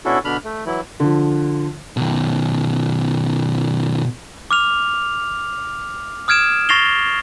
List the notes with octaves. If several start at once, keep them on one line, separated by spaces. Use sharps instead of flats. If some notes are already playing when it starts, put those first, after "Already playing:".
B2 C#4 D4 E4 F#4 A4
B2 D3 D4 B5 F6
A3
E3 F#3 E4
D3 F3
B2 D#3
D6 F6 F7
D#6 F6 G#6 D7 E7
C#6 A6 A#6 C7 F7 G7